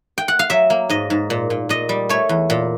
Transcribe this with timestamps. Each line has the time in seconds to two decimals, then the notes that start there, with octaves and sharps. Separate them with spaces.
0.18 G5
0.28 F#5
0.39 F5
0.50 F#3 E5
0.70 A#3
0.89 G#2 D#5
1.10 G#2
1.30 A#2
1.50 A#2
1.69 A#2 D#5
1.89 G3
2.09 A3 C#5
2.29 E2
2.50 A#2